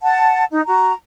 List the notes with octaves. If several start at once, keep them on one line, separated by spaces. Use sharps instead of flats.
F#5 A5
D#4
F#4 A#5